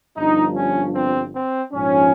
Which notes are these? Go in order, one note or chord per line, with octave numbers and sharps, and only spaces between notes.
G1 G2 F3 D#4
C#4
C4
C4
A#1 G#2 F3 C#4